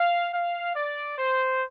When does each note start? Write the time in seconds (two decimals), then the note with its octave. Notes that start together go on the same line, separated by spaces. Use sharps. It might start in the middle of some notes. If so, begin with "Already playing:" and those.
Already playing: F5
0.33 F5
0.76 D5
1.19 C5